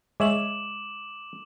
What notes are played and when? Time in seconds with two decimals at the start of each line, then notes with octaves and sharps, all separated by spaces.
0.20 G#3 C#5 E5 D6 E7 F#7